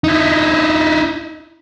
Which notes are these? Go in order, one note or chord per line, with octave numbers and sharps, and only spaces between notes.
D#4 E4